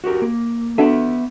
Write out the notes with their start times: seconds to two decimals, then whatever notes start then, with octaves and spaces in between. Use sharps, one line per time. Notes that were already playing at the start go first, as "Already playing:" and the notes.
0.04 F#4 G4 A#4
0.22 A#3
0.78 B3 D4 F#4 A4 E5